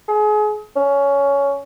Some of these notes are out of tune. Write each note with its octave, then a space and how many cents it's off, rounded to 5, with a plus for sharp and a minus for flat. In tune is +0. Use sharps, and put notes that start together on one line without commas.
G#4 +30
C#4 +15